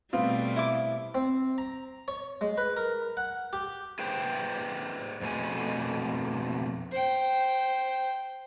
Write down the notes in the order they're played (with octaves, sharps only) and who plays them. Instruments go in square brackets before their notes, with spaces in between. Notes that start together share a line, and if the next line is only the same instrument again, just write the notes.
[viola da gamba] B2 G3 A3 [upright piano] B3 C4 F4
[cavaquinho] E4 D6
[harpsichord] C4
A#5
C#5
G#3
B4
A#4
F#5
G4
[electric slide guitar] G#4 B4 C5 G5
F2 B2 A3 G#5
[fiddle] C5 G5